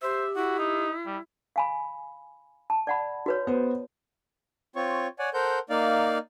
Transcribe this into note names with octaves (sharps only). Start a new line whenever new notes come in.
G4 C5 E5
E4 F#4
D#4
G3
F5 G#5 B5
A5
D5 F#5 B5
F#4 B4 C#5
B3 C5
C4 F4 C#5 C#6
C#5 D5 F#5 G#5
A4 A#4 C5 F#5 G6
A#3 D#4 D5 F5